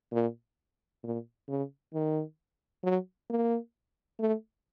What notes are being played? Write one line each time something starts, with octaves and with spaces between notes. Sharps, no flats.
A#2
A#2
C#3
D#3
F#3
A#3
A3